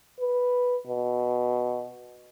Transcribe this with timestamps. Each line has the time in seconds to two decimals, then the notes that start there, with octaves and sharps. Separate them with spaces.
0.20 B4
0.87 B2